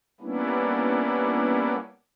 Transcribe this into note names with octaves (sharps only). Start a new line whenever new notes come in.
G3 A#3 B3 C#4 D4 E4